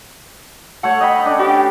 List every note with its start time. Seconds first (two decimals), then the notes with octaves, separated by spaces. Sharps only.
0.83 A3 C#5 F#5
1.00 D#5 G5 B5
1.25 C#4 D4
1.39 G4